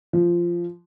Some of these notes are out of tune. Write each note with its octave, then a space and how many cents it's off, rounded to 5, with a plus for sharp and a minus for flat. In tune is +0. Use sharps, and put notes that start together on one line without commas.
F3 -10